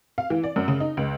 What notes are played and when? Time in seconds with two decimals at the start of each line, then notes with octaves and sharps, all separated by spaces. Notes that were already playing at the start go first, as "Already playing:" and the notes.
0.18 F5
0.30 E3
0.44 D5
0.56 F#2
0.68 C#3
0.80 D#4
0.97 C#2